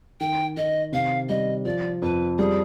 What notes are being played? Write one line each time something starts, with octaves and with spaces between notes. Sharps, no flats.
D#3 G5
D#3 D#5
C3 F5
G3 D#5
F3 D5
F2 B4
G3 G#4